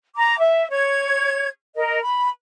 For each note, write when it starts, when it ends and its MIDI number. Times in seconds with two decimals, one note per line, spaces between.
0.16 0.38 82
0.16 0.38 86
0.39 0.67 76
0.72 1.49 73
0.72 1.49 92
1.76 2.00 70
1.76 2.00 75
2.02 2.29 83